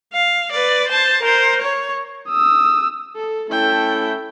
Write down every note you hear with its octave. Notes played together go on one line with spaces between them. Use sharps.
F5
B4 D5
C5 A5
A#4 C5
C#5
D#6 E6
A4
A3 C#4 E4 A4 G5